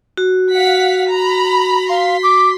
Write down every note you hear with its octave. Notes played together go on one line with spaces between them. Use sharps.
F#4
F5 F#5 B6
A#5 B5
F5 C6 B6
D6